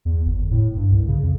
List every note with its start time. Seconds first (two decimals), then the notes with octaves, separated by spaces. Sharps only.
0.05 E2
0.26 G1
0.51 A2
0.76 G2
0.91 C2
1.08 C#3
1.23 F2